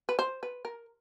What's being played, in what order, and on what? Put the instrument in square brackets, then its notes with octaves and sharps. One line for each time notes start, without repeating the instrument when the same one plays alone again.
[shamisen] B4
C5
B4
A#4